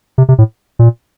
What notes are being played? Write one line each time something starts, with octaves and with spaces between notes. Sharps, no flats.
C3
C3
A2
A#2